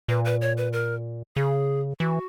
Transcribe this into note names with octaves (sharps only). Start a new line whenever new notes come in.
A#2 B4
B4
C#5
B4
A#4
C#3 G#4
E3 F#4